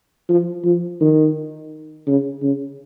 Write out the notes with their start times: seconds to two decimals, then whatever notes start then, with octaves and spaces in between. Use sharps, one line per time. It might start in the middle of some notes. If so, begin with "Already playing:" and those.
0.29 F3
0.65 F3
1.01 D#3
2.07 C#3
2.42 C#3